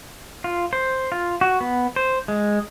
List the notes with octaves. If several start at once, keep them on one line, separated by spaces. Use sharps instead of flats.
F4
C5
F4
F#4
B3
C5
G#3